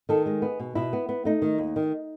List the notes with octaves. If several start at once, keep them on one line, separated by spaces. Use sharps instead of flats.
D#3 A4
G#3 G#4
B3
B2
B2 E4
B3
B3
A3 D#4
D#3
D#2
D#3